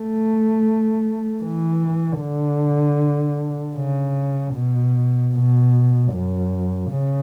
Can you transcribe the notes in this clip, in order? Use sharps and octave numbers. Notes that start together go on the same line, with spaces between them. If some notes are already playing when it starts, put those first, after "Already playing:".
Already playing: A3
E3
D3
C#3
B2
B2
F#2
C#3